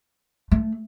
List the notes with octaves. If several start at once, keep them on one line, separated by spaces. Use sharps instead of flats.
A3